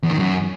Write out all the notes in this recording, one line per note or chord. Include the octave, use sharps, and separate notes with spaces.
E2
D#3
F#2